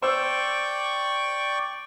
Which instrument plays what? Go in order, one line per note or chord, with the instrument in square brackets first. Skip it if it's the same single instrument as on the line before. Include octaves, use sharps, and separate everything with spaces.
[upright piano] C5 E6 [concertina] D5 G5 C#6